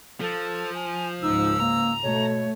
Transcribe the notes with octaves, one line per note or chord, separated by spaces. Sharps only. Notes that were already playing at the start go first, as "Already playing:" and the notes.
F3 A4
G#5
C#2 G#2 D#4 E6
A#3 A#5
B2 A3 C#5